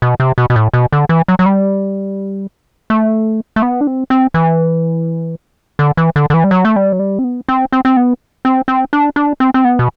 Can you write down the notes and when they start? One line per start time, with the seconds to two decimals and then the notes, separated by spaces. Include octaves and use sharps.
0.02 B2
0.20 C3
0.38 B2
0.50 B2
0.56 A2
0.74 B2
0.92 D3
1.09 E3
1.28 F#3
1.39 F#3
1.46 G3
2.90 A3
3.56 A3
3.62 B3
3.81 D4
3.87 C4
4.10 C4
4.34 E3
5.79 D3
5.97 E3
6.16 D3
6.30 D3
6.34 E3
6.44 G3
6.51 F#3
6.65 A3
6.76 G3
6.92 F#3
6.99 G3
7.19 C4
7.24 B3
7.49 C4
7.72 C4
7.85 C4
7.97 B3
8.45 C4
8.68 C4
8.93 D4
9.16 D4
9.40 C4
9.54 C4
9.64 B3
9.79 B2